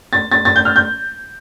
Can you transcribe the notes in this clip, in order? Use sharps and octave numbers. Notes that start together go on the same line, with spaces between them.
A6
A6
A6
G6
F6
G6